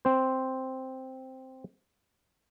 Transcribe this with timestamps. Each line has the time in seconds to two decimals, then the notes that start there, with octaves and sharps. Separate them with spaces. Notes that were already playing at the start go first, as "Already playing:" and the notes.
0.05 C4 C5